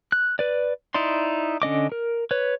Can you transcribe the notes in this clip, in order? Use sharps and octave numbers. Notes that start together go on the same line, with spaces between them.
F#6
B4 D5
D#4 E4 D5 C6
D3 C#4 D#5 D6
A#4
B4 C#5